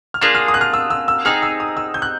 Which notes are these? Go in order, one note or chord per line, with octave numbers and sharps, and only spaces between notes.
F6
A#3 D4 F4 G#4 F#6
F6
D#6
F#6
F6
E6
E6
E6
C4 D#4 G#4 F6
E6
D#6
E6
G6
F#6